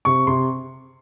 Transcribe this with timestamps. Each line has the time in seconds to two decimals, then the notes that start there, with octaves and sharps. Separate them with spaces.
0.05 C3 C#6
0.27 C3 C6